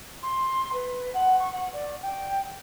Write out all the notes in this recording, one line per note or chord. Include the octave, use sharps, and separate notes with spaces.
C6
B4
F#5
C#6
F#5
D5
G5